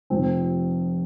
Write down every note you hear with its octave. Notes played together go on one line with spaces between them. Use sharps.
F1 F2 C3 F3 C4